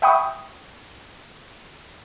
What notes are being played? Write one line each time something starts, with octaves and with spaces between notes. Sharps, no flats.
E5 F#5 G5 B5 C#6 D#6